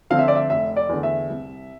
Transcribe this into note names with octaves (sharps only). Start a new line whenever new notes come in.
D3 F3 C4 F5
E5
D5
E5
F1 E5
D5
E2 D3
E5
C2